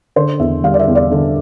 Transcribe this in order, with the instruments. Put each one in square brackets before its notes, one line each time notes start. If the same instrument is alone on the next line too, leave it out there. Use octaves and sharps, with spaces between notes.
[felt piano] D3 C5
E2 E5
G3 F5
D5
E5
E2
D5
D3